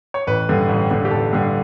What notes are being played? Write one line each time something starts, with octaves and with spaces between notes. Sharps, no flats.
C#5
A1 B4
G2 D3
A1
G2 D3
G4
A1 A4
G2 D3